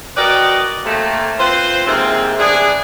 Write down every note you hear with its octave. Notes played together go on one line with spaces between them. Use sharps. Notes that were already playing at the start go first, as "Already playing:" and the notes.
F#4 A#4 B4 D5 D#5 G5
C3 A3 A#3
C4 F4 B4 C5
G#2 C3 E3 A#3 C4
E3 B3 D4 G#4